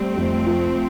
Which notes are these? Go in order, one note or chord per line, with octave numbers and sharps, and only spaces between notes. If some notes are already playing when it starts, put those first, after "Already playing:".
Already playing: G3 A3 C4
F2
F3